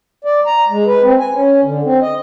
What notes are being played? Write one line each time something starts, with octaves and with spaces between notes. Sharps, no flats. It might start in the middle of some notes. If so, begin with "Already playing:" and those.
D5
A#5
G#3
B4
C4
G#5
C#4
D3
C4
D#5